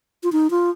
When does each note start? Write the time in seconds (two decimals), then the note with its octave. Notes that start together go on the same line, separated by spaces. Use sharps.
0.23 F4
0.32 D#4
0.50 F4